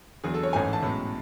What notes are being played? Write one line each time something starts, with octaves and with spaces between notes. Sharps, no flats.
E2 D3 F#3 G#4
A4
C#5
A1 G#2 E3 A3 C#4 G#5
A5
B1 A2 G#3 C#4